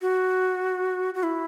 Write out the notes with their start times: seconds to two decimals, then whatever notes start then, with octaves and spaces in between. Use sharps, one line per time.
0.02 F#4
1.15 F#4
1.23 E4